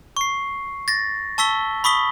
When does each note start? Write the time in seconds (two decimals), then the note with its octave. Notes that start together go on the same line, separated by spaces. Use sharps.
0.17 C#6 C7
0.88 A6 A#6
1.38 A5 C#6 E6 B6 G7
1.84 B5 C#6 D#6 B6 G7